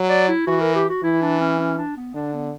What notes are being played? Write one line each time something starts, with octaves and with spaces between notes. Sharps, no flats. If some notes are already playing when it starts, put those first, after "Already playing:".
Already playing: F#3
D5
E4
E3 F#4
A#4
G4
F#4
E3 E4
D4
C#4
C#4
D4
B3
D3 D4
B3